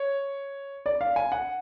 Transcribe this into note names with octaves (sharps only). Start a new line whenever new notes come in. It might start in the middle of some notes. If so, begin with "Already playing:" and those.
Already playing: C#5
D5
F5
G#5
F#5